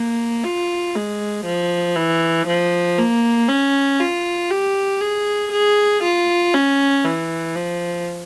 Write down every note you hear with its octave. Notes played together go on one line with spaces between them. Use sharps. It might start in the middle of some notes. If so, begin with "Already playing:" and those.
Already playing: A#3
F4
G#3
F3
E3
F3
A#3
C#4
F4
G4
G#4
G#4
F4
C#4
E3
F3